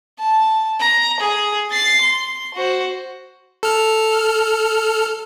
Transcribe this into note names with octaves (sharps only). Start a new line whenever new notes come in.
A5
A#5
G#4
A6 C7
C6
F#4 C5
A4 F6